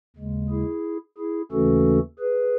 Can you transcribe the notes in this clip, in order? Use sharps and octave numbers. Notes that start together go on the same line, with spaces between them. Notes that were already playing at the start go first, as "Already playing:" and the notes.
D#2 C#3 G#3
E4 G#4
E4 G#4
D#2 C#3 E3 A3 C#4 F#4 A4
G#4 B4